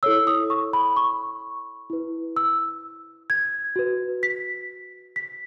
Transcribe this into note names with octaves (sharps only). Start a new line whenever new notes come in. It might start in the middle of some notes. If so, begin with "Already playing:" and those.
E4 A4 C#5 E6
D#6
C#6
B5
C#6
E4 B4
E6
G#6
F#4 B4
B6
B6